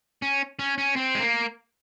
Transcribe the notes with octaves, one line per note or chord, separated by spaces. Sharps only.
C#4
C#4
C#4
C4
G#3
A#3